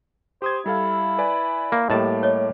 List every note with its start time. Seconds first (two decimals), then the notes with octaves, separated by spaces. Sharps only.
0.42 G4 C5 D#6 G#6
0.66 G3 E4 A4 F5
1.18 B4 D5 G#5
1.72 A#3
1.90 A2 G3 A#3 G4 D#5 A5
2.23 C#5 D#5